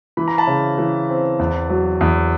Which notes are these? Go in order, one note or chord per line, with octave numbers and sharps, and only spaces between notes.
E3 B5
A#5
A5 B5
C#3
E3
C4
E2
F#3
E2